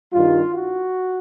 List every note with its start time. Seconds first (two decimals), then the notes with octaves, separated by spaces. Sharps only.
0.12 G2 D#3 G3 F4
0.52 F#4